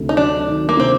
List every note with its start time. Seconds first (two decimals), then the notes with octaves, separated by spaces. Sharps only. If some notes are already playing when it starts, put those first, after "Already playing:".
Already playing: D2 C3
0.09 D#4
0.17 F#3 D4
0.47 D#3
0.69 A#3
0.77 C3 C4